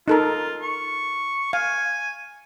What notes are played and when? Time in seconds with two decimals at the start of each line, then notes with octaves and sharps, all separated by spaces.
0.08 D#4 F4 A4 A#4
0.62 C#6
1.53 F5 G#5